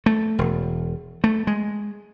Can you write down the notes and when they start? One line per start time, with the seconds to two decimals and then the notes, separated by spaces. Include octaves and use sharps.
0.06 A3
0.39 E1
1.24 A3
1.47 G#3